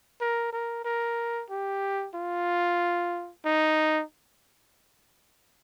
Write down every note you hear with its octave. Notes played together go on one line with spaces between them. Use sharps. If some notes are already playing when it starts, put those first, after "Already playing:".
A#4
A#4
A#4
G4
F4
D#4